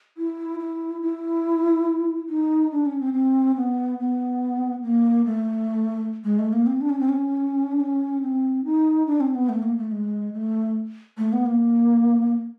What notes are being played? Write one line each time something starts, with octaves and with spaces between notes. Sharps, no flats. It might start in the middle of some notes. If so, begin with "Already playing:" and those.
E4
E4
E4
D#4
D4
C#4
C4
C4
B3
B3
A#3
A3
G#3
A3
A#3
C4
D4
C#4
C4
C#4
D4
C#4
C4
D#4
D4
C4
B3
A3
A#3
A3
G#3
A3
A3
B3
A#3